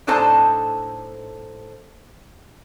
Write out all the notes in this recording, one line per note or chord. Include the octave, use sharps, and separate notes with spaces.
A2 D4 D#4 A4 C5 A5